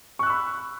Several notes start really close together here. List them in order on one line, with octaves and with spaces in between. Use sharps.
C#6 F#6 E6 B5